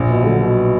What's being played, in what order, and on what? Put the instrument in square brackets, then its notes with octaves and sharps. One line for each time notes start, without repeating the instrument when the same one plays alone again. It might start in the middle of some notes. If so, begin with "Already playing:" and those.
Already playing: [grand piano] A#1
[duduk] B2
[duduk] D3 [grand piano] F#3
[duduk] B2